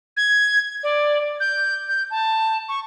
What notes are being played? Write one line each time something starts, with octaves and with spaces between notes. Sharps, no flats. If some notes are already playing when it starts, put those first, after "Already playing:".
G#6
D5
G6
G6
A5
C#6